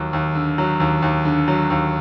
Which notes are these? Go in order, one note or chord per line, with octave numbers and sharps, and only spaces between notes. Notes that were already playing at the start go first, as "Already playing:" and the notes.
Already playing: D#2 F#3
D#2
D3
F#3
D#2
D#2
D3
F#3
D#2